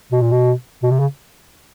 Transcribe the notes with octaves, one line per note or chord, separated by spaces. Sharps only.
B2
A#2
B2
B2
C3
C#3